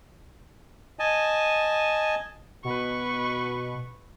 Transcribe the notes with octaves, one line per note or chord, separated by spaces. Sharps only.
D#5 G#5 A5
B2 B4 C#6